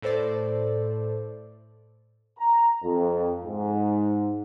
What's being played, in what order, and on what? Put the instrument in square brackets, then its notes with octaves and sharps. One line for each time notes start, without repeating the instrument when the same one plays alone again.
[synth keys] A2 A4 C5 D5
[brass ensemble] A#5
F2
G#2